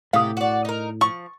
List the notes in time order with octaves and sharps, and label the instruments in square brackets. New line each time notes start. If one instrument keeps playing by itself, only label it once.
[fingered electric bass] A2 [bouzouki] C3 G4 [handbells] F5 D#6
[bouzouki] F#4 D5
D#4 A#4
[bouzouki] F3 [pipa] C#6